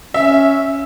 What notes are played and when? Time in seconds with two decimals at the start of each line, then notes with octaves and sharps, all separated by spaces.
0.14 C#4 E5